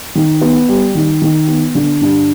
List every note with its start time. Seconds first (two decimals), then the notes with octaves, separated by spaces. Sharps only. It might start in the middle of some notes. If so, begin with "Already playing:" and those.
0.15 D#3
0.41 B3
0.68 G3
0.95 D#3
1.22 D#3
1.48 B3
1.75 D3
2.01 G2